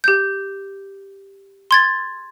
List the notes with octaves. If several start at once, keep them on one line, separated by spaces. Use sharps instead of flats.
G4 G6
C6 G#6 A6